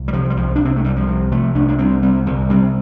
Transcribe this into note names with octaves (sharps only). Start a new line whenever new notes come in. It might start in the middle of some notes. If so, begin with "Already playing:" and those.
Already playing: C2
G3
C3 F3
G3
C2 F3
D4
C3 C4
A3
C2 G3
F3
C3
C3 F3 A3
C2 A3 D4
D4
C2 G3 C4
C2 G3 C4
C2
C3 G3 C4